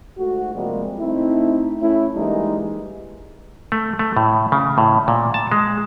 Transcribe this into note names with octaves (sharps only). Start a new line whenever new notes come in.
G#2 A3 F#4
C3 F3 G3 G#3 A#3
A3 C4 D#4 E4
A3 C#4 E4
E3 G3 G#3 A#3 D#4
A3
A3
A2
C#3
A2
A#2
A5
G#3